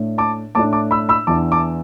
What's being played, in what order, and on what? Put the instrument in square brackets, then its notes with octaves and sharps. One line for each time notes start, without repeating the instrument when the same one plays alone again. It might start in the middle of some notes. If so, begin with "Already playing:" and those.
Already playing: [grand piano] A2 A3 D4
A5 D6
A2 A3 D4 A5 D6
A5 D6
B5 E6
B5 E6
E2 E3 B3 D4 A5 D6
A5 D6